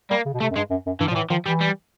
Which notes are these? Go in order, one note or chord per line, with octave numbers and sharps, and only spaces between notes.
G3 A#3
C#3
B2
C3 A3
F#2
G2 G#3
F#2
F#2
G2 E3
F3
A#2
A2 E3
D#3 F3
E3 G3
G3